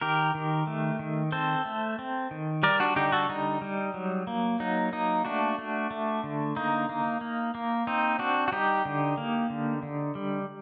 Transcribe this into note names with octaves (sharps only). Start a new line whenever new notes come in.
D#3 G4 A#4
D#3
A3
D#3
C4 A4 C5
A3
C4
D#3
G3 A#4 D5
D4 F#4
D3 D#4 G4
F#4 A4
G3 D#4
G3
F#3
A#3
F#3 D#4
A#3 D#4
A3 D4 F#4
A3
A3
D3
A#3 D#4
A#3
A#3
A#3
C4 D#4
C4 D4 F#4
F#4
G3 D#4 G4
D3
A#3
D3
D3
G3